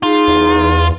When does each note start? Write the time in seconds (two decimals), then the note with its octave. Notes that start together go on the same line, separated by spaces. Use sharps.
0.03 D#4 F4 G#4
0.28 E2